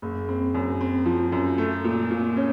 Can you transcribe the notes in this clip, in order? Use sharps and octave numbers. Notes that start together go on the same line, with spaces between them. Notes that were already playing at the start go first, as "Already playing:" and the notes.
F#1
C4
F#2
C4
F3
F#2
A3
A#2
A#2
C#4